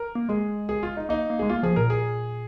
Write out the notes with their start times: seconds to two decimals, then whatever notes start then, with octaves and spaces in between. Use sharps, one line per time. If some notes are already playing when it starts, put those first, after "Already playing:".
Already playing: A#4
0.15 A#3
0.29 G#3 G#4
0.69 G#4
0.83 F4
0.97 D#4
1.09 A#3 D#4
1.30 A#3
1.39 G#3 G#4
1.49 A#3 F4
1.63 F3 G#4
1.76 A#2 A#4
1.90 G#4